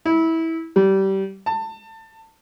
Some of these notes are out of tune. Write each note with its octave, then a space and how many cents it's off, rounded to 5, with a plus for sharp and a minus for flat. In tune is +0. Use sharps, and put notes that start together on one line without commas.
E4 -20
G3 -25
A5 +25